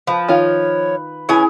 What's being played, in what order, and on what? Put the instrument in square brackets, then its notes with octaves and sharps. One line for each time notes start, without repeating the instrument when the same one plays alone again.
[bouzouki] F3 [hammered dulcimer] B4
[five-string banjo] D#3 F4 [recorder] C#5
[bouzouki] E3 C#4 G#5 [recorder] E4 [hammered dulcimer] G#4